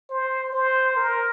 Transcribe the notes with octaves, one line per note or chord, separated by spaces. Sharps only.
C5
C5
A#4